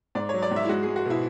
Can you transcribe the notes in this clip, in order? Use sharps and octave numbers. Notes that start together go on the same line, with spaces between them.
G#2 D5
F#3 C#5
D5
G#2
E5
E4
G#3 F#4
G#3 G#4
F#4
B2 E4